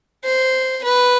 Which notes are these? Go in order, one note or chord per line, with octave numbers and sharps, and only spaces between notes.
C5
B4